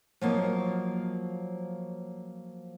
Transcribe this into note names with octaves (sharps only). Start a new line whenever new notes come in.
F3 F#3 A#3 D#4